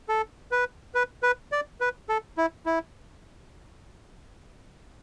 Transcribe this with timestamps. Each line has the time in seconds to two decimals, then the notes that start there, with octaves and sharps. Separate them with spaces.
0.09 A4
0.52 B4
0.95 B4
1.23 B4
1.52 D5
1.81 B4
2.09 A4
2.38 E4
2.66 E4